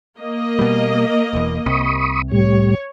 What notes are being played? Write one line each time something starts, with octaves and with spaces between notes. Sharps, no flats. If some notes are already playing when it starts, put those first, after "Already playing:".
A#3 D#5
B2 G3
E1 E2
C2 C3 B5 C#6 D#6
A2 G3 C#5